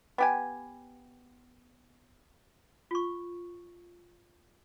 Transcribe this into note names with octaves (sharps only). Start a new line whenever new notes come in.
B3 G4 G#5
F4 C#6